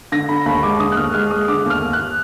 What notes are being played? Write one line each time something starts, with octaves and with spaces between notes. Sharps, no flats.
D3 A#6
D3 B5
D#2 B5
G#3 D6
D3 D#6
F#6
D#2 F6
G#3 F6
G#3 D#6
D3 D6
D#2 F6
D#2
F#6